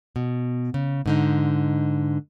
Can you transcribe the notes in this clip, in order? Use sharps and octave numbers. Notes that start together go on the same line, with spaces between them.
B2
C#3
G#2 D3 D#4